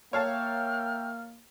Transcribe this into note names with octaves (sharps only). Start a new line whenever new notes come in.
A#3 A#4 C#5 E5 F5 G5 A5 F6